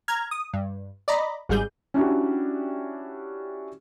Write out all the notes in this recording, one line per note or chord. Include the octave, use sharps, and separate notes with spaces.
A#5 F6 G#6
D#6
G2
D5 D#5 A#5 B5
G#1 G#2 G3 G#4 G6
C#4 D4 E4 F#4 G4